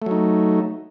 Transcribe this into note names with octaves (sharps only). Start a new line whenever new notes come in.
F#3 A3 D#4